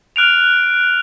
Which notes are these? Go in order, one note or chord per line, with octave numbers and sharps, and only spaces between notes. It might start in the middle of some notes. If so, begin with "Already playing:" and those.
F6 F#6 D7 F7